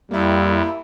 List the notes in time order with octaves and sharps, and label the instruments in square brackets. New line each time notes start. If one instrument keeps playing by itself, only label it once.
[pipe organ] F2 [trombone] G3 [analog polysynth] A#3 E4